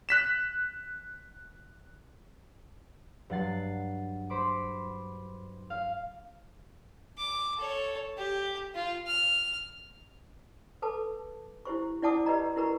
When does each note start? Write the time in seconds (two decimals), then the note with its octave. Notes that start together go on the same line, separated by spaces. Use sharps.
0.09 F#6 B6 E7
3.30 G2 F#3 F#5 A6 C7
4.30 C5 B5 D6
5.70 F5
7.18 D6
7.58 A4 C#5
8.17 G4
8.75 F4
9.07 F6
10.82 A4 B4 A5 D6
11.65 E4 G4 C5 C#6
12.03 E4 D5 F#5 A5 D6 D#6
12.26 G4 B4 D5 D#5 A#5
12.56 E4 F#4 A#4 B4 A#5 C#6